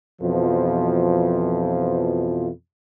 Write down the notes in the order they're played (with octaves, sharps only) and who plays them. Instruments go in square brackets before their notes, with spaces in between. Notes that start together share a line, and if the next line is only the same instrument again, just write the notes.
[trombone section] F2 B2 E3 F3